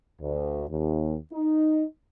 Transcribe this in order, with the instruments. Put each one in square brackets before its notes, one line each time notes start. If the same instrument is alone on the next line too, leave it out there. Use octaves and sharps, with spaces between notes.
[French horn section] D2
D#2
D#4